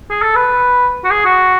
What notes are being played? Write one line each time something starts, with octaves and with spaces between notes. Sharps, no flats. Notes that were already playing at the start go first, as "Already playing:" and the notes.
G#4
A4
B4
F#4
G#4
F#4